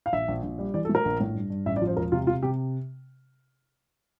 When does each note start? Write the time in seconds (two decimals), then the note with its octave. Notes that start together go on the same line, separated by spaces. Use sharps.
0.06 F5
0.13 A#1 E5
0.28 A#1
0.43 A#1
0.58 G3
0.74 E3 D5
0.85 A4
0.89 A3
0.95 A#4
1.05 A#1
1.20 A2
1.35 G2
1.50 G2
1.66 A1 E5
1.76 D5
1.82 F3
1.87 C5
1.97 E1 A#4
2.12 C3 F4
2.27 C3 F4
2.43 C3 G4